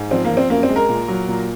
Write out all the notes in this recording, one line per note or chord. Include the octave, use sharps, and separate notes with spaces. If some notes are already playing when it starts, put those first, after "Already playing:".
Already playing: G#2
F3 C4
A#3
F3
C4
F#2 A#3
C4
G#3
A#4
A#2
F#3
A#2